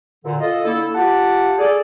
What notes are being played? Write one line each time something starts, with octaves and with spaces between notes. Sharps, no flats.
A#2 D3
F4 A4 D#5
D3 A#3 E4 A4
F4 G4 F#5 A5
G#4 A4 D5